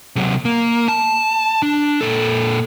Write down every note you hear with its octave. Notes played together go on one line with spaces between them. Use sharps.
C3 F#3
A#3
A5
D4
A#2 A4